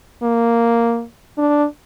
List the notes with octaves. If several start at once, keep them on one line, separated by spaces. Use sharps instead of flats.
A#3
D4